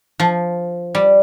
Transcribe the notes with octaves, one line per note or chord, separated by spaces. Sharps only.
F3
G3